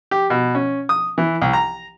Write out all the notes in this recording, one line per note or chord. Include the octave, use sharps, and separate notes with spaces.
G4
B2
C#4
D#6
E3
C2
A#5